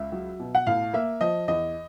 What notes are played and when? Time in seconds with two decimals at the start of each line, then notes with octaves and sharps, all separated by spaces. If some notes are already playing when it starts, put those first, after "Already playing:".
Already playing: C#2 E5
0.12 F#3
0.40 B2
0.55 F#5
0.67 A2 F5
0.94 A#3 E5
1.21 F3 D#5
1.48 E2 D#5